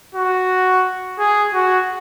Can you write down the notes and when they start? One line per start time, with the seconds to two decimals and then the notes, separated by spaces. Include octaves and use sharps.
0.15 F#4
1.19 G#4
1.54 F#4